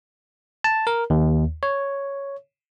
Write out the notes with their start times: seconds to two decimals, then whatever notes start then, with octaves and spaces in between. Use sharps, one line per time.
0.64 A5
0.87 A#4
1.10 D#2
1.63 C#5